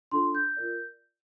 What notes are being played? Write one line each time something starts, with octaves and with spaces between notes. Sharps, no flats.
D4 F4 A4 C6
G6
F4 A#4 D5